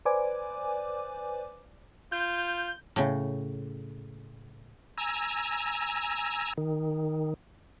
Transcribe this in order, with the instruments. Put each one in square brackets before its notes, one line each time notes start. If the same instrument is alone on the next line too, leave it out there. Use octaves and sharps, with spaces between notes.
[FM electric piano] B4 C5 D5 G#5 D6
[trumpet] F4 [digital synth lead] G6
[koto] A2 C#3
[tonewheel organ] G#5 A#5 E6
D#3